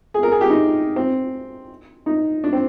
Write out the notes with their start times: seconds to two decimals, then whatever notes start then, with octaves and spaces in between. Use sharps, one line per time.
0.14 G#4
0.23 A#4
0.32 G#4
0.41 G4
0.50 D#4
0.96 C4
2.06 D#4
2.44 D4
2.53 C4